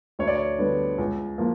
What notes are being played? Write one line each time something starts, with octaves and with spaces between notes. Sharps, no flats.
D2 C#5
D5
C#5
D3 G3 B3
C#2
F3 A#3